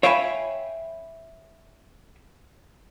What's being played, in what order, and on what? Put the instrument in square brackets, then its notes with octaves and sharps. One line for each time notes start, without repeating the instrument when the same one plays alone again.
[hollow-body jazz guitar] C#5 E5 F5 G5 G#5 B5